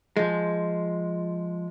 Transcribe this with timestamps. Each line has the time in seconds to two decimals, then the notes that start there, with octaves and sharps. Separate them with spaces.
0.17 F3 G#3